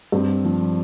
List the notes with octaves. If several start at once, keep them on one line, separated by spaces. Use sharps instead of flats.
G2 C4
F3